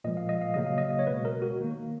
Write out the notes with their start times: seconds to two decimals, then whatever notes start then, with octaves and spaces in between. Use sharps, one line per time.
0.04 A#2 F3 G#3 D#5
0.17 F5
0.29 D#5
0.41 F5
0.54 C#3 F#3 A#3 D#5
0.66 F5
0.78 D#5
0.91 D#5
0.99 C#5
1.07 B2 G#3 B4
1.25 A#4
1.42 F#4
1.59 D#3 A#3